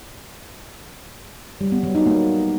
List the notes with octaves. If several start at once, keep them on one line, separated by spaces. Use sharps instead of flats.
G3
B3
F#3
D#4
A#3